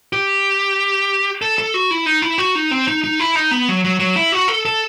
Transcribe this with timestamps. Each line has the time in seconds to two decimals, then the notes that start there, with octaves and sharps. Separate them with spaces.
0.13 G4
1.42 A4
1.58 A4
1.74 F#4
1.91 E4
2.06 D#4
2.22 E4
2.38 F#4
2.55 D#4
2.71 C4
2.88 D#4
3.04 D#4
3.20 E4
3.35 D#4
3.51 B3
3.68 F#3
3.85 F#3
4.00 F#3
4.16 E4
4.32 F#4
4.48 A4
4.65 A4